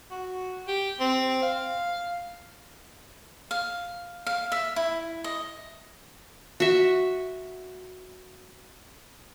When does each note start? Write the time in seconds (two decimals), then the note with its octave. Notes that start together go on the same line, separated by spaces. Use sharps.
0.11 F#4
0.68 G4
1.00 C4
1.42 F5
3.51 F5
4.26 F5
4.52 E5
4.76 E4
5.24 D#5
6.60 F#4 E5